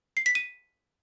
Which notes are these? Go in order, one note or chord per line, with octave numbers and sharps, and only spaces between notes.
C7
B6
D#7